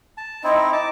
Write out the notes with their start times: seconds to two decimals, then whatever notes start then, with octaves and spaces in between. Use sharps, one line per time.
0.17 A5
0.44 C4 D#4 E4 D#5
0.73 A5 D6